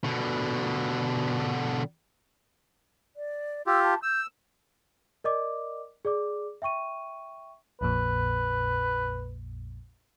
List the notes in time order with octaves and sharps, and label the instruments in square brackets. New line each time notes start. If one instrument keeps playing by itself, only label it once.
[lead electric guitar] B2 D3
[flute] D5
[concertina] F4 G4 [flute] E6
[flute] A5
[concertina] E6 [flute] G6
[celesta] A#4 D5 D#5 D6
G#4 D5 D6
E5 G5 C#6 D#7
[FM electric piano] A#1 F2 A#2 [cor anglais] B4